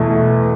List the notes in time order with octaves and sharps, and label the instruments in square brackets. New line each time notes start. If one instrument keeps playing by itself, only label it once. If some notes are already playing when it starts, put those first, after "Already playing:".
Already playing: [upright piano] E2 B2 A3